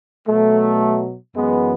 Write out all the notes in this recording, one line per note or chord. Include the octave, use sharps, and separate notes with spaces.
B2 F#3 A3
F#2 E3 G#3 B3